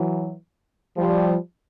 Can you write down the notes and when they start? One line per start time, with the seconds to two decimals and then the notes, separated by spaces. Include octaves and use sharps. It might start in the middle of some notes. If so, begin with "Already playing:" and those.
Already playing: E3 F#3
0.97 F3 G3